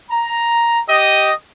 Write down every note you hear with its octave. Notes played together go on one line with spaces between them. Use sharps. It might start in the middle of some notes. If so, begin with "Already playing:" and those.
A#5
G4 D#5